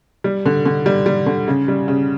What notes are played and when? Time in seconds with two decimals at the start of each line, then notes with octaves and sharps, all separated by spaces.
0.24 G3
0.46 D3
0.65 D3
0.86 G3
1.06 G3
1.26 D3
1.48 C#3
1.68 G3
1.88 C#3